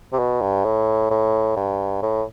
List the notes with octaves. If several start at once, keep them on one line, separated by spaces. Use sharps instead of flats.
C3
B2
G2
A2
A2
G2
A2